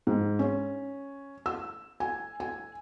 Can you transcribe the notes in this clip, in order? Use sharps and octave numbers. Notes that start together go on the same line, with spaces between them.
G#2
C#4
E6
G#5
G#5